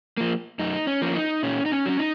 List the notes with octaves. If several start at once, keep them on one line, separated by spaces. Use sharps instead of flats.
F3 A#3
F#2 D#4
C#4
F3 A#3 C#4
D#4
A#2 C#4
D#4
C#4
F#3 C#4
D#4